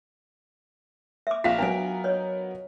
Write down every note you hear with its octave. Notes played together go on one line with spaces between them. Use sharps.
E5 D6
A#1 F4 F5 A#5 B6
F#3 B3 D4 A#4 G#5
C#5 D#5